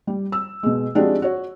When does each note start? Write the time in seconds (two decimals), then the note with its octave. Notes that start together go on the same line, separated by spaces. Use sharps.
0.07 G3
0.32 E6
0.63 B2 G#3
0.95 F3 G#3 C4 D4 F#4 G4
1.22 F#4 C#5